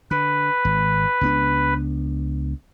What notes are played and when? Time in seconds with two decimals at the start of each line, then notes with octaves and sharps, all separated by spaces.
0.11 D3 B4
0.65 G#1
1.21 C#2 B3 D4